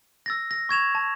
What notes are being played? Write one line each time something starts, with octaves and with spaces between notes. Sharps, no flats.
E6 A6 A#6
A#6
C#6 G#6 E7 F7
A5